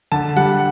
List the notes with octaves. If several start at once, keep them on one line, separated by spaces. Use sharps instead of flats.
D3 A5
G3 F#5